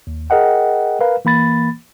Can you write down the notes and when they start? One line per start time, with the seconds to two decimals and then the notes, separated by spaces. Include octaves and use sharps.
0.07 D#2
0.30 G#4 A#4 D#5 F#5 G5
1.01 A#4 B4 F5
1.25 E3 A#3 B5 A6